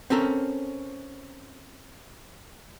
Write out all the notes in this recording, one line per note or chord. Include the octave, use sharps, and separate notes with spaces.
C4 C#4 A4 A#4